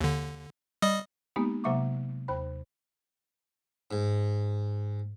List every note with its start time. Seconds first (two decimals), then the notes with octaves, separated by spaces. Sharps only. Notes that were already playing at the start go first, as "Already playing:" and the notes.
0.01 D#2 D3
0.82 G3 D#5 D#6
1.36 G#3 A#3 B3 D#4 G4
1.64 C3 F#3 A#3 E5 C#6 D6
2.28 D#2 C5 B5
3.91 G#2